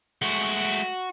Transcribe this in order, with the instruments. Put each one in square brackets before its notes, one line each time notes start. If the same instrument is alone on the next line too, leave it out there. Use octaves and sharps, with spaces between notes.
[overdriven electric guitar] G#3 A3 [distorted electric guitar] F#4